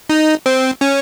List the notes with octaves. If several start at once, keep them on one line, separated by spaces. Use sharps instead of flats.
D#4
C4
C#4